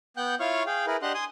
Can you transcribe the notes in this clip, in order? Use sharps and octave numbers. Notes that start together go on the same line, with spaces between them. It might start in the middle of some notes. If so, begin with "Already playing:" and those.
B3 F#5 G5 F#6 G6
E4 F4 C#5 F5 C#6 F6
G#4 F5 G5
E4 G#4 A#4 B4
D4 G4 D#5 F#5 C6 F#6
G#5 C6 D#6